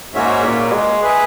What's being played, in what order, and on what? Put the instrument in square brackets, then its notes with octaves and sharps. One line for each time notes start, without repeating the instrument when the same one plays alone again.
[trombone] G#2 [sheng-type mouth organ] A#3 C#4 F#4 C#5 E5
[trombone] A#2
G#3
[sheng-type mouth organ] G#4 B4 E5